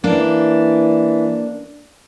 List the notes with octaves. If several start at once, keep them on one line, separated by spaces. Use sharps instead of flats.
E3 A#3 D4